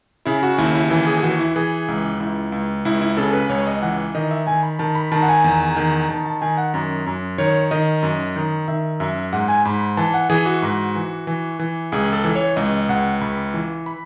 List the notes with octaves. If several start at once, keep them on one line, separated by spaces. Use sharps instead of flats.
C#3 E4
F#4
D#2 E4
E4
E3 E4
G#4
G#4
E3 F#4
E4
E3 G#4
C#2
C#2 E4
C#2
C#2 E4
E4
C#3 A4
B4
C#2 C#5
D#5
E3 F#5
D#3 D#5
E5
D#3 G#5
B5
D#3 A5
B5
D#3 A5
F#5
G#5
E2
D#3
D#3 A5
A5
D#3 G#5
F#5
F#2
F#2
D#3 C#5
D#3 D#5
F#2
D#3
D#3 E5
F#2 E5
G#2 F#5
G#5
G#2 B5
E3 A5
F#5
E3 G#4
F#4
G#2
E3
E3
E3
C#2 G#4
A4
E3
C#5
C#2 D#5
C#2 F#5
C#2 B5
E3
B5